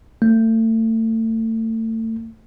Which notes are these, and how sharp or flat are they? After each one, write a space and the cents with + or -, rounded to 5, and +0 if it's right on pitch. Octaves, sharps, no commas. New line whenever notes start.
A3 +30